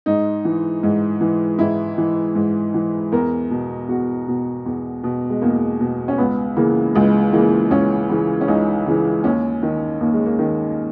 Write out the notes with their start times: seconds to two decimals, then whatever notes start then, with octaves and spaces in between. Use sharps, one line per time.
0.06 G#2 D#4
0.45 E3
0.83 G#2
1.21 E3
1.59 G#2 E4
1.98 E3
2.35 G#2
2.74 E3
3.12 E2 A#4
3.51 B2
3.88 E2 F#4
4.28 B2
4.66 E2
5.04 B2
5.30 G#3
5.41 E2 A#3
5.80 B2
6.08 C#4
6.18 C#2 B3
6.56 C#3 E3 A#3
6.95 C#2 G#3
7.33 C#3 E3 A#3
7.71 C#2 C#4
8.09 C#3 E3
8.41 C#4
8.48 C#2 D#4
8.86 C#3 E3
9.24 D#2 C#4
9.63 D#3
10.00 D#2 A#3
10.13 G#3
10.26 A#3
10.39 D#3